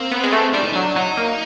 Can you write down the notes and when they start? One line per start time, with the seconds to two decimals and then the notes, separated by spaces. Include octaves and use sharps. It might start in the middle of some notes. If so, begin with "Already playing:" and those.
Already playing: A#3 C4
0.11 B3
0.23 G#3
0.32 A3
0.53 G3 D4
0.63 D#4
0.72 F#3 D4
0.96 F#3 D#4
1.17 A#3